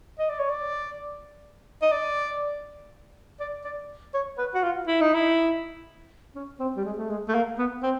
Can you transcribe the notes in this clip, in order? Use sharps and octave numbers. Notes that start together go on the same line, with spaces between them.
D#5
D5
C#5
D5
D#5
D5
D5
D5
C#5
B4
F#4
F4
E4
D#4
E4
C#4
C4
G3
G#3
A3
G#3
A3
A#3
B3
C4